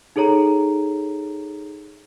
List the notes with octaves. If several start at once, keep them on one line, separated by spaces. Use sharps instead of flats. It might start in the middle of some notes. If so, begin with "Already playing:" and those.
D#4 G#4 A4 C#5 A#5